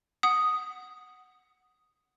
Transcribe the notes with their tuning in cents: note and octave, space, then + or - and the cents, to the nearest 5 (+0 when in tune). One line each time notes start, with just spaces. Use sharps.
F#5 +0 D#6 +0